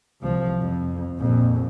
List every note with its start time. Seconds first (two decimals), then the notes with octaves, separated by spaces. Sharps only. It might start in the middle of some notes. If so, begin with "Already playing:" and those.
0.20 C2 F3
0.60 F2
1.19 A#1 F2